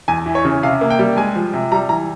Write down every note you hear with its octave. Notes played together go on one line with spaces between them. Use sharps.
E2 G#5
E3
C#5
C#3
C3 F5
A#3
G5
G3
G#3 G#5
F3
C3
G3 A#5
E3 A#5